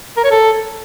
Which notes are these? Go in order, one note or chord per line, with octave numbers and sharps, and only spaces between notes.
A#4
C#5
A4